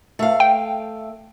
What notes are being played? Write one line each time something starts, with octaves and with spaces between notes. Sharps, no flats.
A3 F5
G5